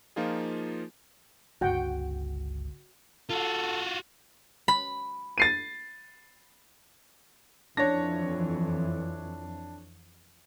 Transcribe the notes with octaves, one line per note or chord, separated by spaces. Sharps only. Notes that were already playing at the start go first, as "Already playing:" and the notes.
F3 A#3 D#4 F4 G#4
G1 C#2 F#4 F#5 G5
F4 F#4 A4
B5
A6 C7 D#7
F2 E3 D4 C#5 A#6